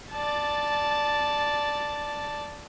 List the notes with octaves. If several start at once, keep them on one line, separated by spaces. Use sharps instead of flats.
D5 A5